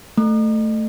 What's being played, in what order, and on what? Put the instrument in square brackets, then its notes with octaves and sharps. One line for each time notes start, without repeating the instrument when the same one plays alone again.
[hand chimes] A3